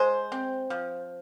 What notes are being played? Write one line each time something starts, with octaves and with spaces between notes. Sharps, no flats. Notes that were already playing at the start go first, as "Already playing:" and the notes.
Already playing: G#3 C5
C4
F3